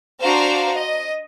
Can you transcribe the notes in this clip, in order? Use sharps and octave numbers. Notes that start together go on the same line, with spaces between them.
D4 F#4 C5 F5 A#5
D#5